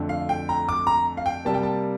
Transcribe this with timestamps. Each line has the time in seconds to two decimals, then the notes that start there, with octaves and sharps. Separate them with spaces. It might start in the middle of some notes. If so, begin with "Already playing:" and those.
Already playing: F2 D3 A3
0.09 F5
0.29 G5
0.49 A#5
0.69 D6
0.87 A#5
1.17 F5
1.26 G5
1.45 C3 G3 A#3 A5
1.54 G5
1.63 A5